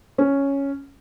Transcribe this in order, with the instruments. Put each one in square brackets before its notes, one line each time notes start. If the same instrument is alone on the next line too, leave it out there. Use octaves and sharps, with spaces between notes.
[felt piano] C#4